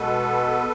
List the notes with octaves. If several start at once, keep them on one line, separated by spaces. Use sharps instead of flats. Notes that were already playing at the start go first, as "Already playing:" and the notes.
Already playing: B2 G#3 B3 A4 B4